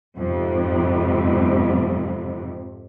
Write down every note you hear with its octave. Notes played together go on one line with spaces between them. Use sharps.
F2 G#2 C3